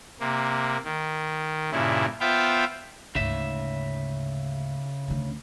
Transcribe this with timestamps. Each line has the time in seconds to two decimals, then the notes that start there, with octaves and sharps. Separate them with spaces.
0.20 C3 A#3
0.85 D#3
1.72 G2 A#2 C#3 E4
2.20 B3 F4 C5 E5 F5 G5
3.15 D2 G#2 C#3 E5
5.08 D2 D3